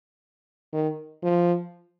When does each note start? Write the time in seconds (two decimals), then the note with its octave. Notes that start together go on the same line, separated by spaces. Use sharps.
0.73 D#3
1.23 F3